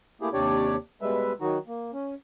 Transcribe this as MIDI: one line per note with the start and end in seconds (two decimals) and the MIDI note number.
0.21 0.29 57
0.21 0.29 58
0.21 0.29 64
0.21 0.29 67
0.21 0.29 68
0.33 0.76 39
0.33 0.76 48
0.33 0.76 62
0.33 0.76 67
0.33 0.76 73
0.33 0.76 74
1.02 1.33 47
1.02 1.33 55
1.02 1.33 56
1.02 1.33 71
1.02 1.33 76
1.41 1.58 51
1.41 1.58 54
1.41 1.58 63
1.41 1.58 66
1.67 1.91 58
1.93 2.14 61